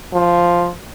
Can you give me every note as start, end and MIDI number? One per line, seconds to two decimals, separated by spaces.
0.13 0.70 53